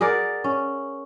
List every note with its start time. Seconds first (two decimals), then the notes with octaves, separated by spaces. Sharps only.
0.01 G#4 A#4 D5 F#5
0.44 C#4